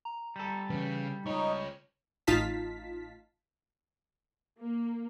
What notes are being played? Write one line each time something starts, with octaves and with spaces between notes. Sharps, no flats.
A#5
G3 A4
C#3 E3
C#2 D#4 C#5 C#6
A1 D#4 F4 F5 A5 B6
A#3